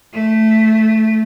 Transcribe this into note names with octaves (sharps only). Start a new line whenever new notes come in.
A3